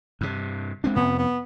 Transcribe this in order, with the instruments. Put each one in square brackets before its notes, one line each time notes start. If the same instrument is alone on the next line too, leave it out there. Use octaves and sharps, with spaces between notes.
[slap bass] G2 C3
G#3 C4 D4
[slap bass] F2 C3 [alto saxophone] B3
[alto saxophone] B3